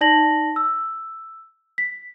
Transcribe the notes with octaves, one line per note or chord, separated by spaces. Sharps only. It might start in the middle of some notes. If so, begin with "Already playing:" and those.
D#4 D5 A5 A#6 F#7
E6
B6